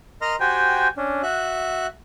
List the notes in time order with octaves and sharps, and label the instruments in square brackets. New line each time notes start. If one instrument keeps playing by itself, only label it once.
[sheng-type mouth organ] A#4 D#5 A#5 C6 F6
F#4 G4 C5 G5 G#5
C#4 D4
F#4 E5 F#6